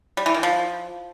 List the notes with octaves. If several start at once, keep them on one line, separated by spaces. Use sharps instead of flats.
G3
E3
D#3
F3